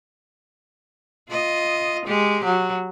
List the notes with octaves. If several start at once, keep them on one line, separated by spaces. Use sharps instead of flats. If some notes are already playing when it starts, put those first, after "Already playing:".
F4 D#5
G#3 G4
F#3